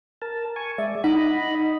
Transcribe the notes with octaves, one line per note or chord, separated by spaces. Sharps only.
A#4 A5
G#5 C#6
G#3 D5 E5
D#4 D#5 F#5 B5